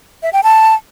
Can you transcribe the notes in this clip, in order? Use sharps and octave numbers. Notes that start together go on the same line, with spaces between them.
E5
G5
A5